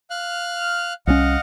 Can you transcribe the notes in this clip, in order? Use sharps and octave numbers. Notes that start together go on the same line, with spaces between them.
F5 F6 F#6
C2 F#3 C#4 D#5 F5 F#5